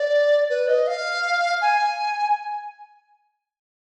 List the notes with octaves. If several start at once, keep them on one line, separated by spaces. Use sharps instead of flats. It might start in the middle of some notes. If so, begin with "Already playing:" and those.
Already playing: D5
B4
D#5
F5
G#5